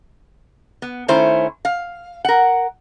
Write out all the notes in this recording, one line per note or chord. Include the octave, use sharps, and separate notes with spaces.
B3
D#3 A3 C#4 E4 C5
F5
A#4 F#5